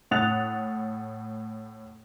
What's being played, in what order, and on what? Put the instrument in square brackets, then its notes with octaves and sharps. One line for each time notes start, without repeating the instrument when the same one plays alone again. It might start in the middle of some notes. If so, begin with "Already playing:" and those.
[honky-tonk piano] A2 F#5 D#6 F#6 A6 F7